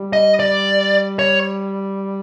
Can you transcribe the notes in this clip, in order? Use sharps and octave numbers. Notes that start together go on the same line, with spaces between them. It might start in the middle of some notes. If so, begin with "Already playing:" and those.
Already playing: G3
D#5
D5
C#5